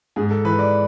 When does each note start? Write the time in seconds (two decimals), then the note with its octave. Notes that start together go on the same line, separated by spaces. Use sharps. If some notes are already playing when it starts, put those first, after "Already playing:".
0.16 G#2 G#4
0.31 A4
0.45 E3 B4
0.59 D5